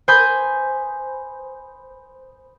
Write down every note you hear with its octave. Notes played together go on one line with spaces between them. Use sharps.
C5 G#5 B5 D#6 G6